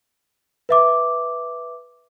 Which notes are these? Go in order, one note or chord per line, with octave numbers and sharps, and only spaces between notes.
B4 E5 D6